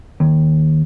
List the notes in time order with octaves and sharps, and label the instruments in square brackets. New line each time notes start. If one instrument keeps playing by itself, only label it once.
[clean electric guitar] D#2